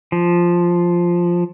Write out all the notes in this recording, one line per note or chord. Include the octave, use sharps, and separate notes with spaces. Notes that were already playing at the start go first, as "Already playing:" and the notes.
F3